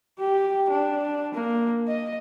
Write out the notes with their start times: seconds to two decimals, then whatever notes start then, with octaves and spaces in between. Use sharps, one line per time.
0.20 G4
0.71 D4
1.34 A#3
1.88 D#5